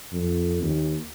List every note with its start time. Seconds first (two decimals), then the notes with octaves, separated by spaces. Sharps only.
0.12 F2
0.62 D#2